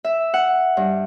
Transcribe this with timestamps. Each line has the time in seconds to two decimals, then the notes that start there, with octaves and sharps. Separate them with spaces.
0.04 E5
0.34 F#5
0.77 G2